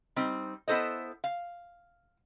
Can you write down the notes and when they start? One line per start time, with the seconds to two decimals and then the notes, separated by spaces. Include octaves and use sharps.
0.16 G3 C4 D#4
0.68 B3 E4 A4 C5 D#5
1.24 F5